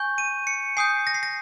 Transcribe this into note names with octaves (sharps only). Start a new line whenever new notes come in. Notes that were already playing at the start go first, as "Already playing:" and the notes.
Already playing: G#5 C#6 G6
D#7
C#7
G#5 D#6 G6 C7
A#6
C7
A#6